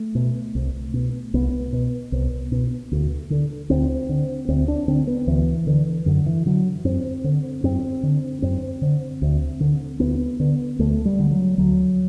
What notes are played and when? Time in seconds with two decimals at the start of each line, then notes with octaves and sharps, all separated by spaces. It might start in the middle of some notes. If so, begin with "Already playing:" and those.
Already playing: A3
0.15 B2
0.55 C2
0.94 B2
1.34 C2 B3
1.72 B2
2.12 C2
2.52 B2
2.92 D2
3.30 D3
3.70 D2 C4
4.09 D3
4.48 D2 C4
4.68 D4
4.88 D3 C4
5.07 B3
5.27 D2 E3
5.67 D3
6.06 F#2 D3
6.26 E3
6.46 D3 F#3
6.84 F#2 C4
7.24 D3
7.63 F#2 C4
8.03 D3
8.42 F#2 C4
8.82 D3
9.22 D2
9.60 D3
10.00 D2 B3
10.40 D3
10.79 D2 A3
11.05 G3
11.19 D3
11.31 F#3
11.58 D2 F#3